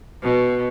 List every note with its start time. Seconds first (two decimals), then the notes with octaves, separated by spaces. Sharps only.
0.22 B2